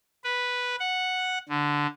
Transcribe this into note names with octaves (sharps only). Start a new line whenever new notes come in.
B4
F#5
D3